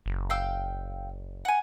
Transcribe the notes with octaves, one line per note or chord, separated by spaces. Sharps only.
F#1
F5 G5 E6
F#5 G#5